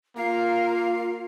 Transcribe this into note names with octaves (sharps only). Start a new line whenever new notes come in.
A#3 F4 A#4 F5